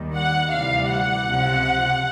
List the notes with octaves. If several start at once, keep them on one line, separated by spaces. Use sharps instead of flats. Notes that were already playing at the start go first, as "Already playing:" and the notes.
Already playing: D#2 D#3 G3
F#5
D2 C3 E3 G3 F5
F#5
C#2 C3 F3